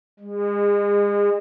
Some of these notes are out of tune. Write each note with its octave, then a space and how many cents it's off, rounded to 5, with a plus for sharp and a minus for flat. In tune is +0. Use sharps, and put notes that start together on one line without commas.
G#3 -35